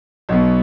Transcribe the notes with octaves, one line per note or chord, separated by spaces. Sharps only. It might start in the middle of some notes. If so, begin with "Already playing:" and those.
B1 B2 B3